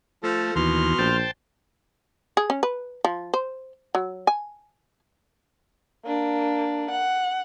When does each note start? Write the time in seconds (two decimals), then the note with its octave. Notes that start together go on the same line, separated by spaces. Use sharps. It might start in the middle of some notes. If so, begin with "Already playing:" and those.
0.23 F3 A3 A4
0.56 D#2 B2 E3 C6 F6
0.99 A#1 C5 G5 A5
2.37 G#4
2.50 C#4
2.63 B4
3.04 F3
3.34 C5
3.95 F#3
4.27 G#5
6.05 A#3 D4
6.91 F#5